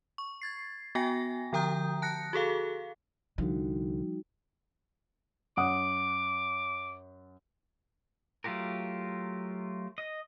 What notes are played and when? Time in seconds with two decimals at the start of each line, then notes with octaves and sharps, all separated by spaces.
0.18 C#6
0.42 G#6 A6 C7
0.95 B3 F#4 G5 G#5 A#6
1.53 D3 F3 G5 A#5 D#6 G6
2.02 A5 F#6 A#6 C#7
2.33 F#4 G#4 A4 F5
3.38 C2 D3 F3 G3 D#4 F#4
5.57 F#2 F#5 D6 D#6
8.44 F#3 A3 F4 G4 A#4
9.98 D#5